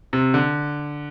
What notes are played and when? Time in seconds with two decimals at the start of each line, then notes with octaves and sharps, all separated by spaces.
0.13 C3
0.34 D3